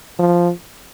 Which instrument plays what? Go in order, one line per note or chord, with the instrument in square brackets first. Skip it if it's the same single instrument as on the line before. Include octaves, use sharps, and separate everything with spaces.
[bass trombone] F3